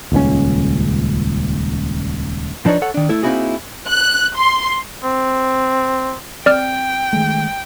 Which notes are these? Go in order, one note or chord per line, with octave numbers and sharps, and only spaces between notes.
D#1 C#2 C#3 C#4
F3 D4 D#4 B4 C#5
A4 C#5 F#5
D#3 D4
A3 E4 A4
A#3 C4 D#4 E4 F#4 G#4
F#6
C6
C4
C4 D5 G5 F6
D#3 G#3 A3